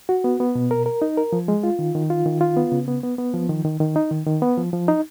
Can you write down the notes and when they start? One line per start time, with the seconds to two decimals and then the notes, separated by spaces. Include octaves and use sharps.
0.09 F#4
0.24 B3
0.40 B3
0.55 B2
0.71 A#4
0.86 A#4
1.02 D#4
1.17 A#4
1.33 F3
1.48 G#3
1.64 F4
1.79 D#3
1.95 D#3
2.10 F4
2.26 D#3
2.41 F4
2.57 B3
2.72 C#3
2.88 B3
3.03 B3
3.18 B3
3.34 F3
3.49 D#3
3.65 D#3
3.80 D#3
3.96 D#4
4.11 D#3
4.26 D#3
4.42 B3
4.58 F3
4.73 F3
4.88 D#4